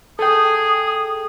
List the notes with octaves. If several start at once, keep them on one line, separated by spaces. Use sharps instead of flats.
G#4 A4 G5 D#6